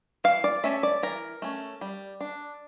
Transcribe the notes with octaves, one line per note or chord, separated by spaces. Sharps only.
E3 F5
D5
A3 C#4 E5
D5
E3 A#4
A3 C#4
G3
D4